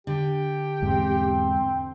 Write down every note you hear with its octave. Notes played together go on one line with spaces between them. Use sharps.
D3 G4
E2 G#2 C4